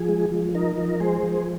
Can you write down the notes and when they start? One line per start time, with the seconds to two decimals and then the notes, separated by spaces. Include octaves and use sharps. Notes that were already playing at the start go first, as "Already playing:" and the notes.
Already playing: F3 G#4
0.09 G#3
0.32 F3
0.55 D#4 A#4
0.78 F3
0.89 A#4
1.00 G#3 G#4 C5
1.23 F3